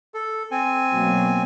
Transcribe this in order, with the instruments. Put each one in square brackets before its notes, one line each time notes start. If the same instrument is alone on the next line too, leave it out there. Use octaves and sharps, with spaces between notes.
[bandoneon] A4
C4 G#5
[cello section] B2 F#3 A#3